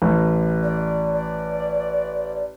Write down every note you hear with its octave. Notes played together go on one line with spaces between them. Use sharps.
A1
D5
D5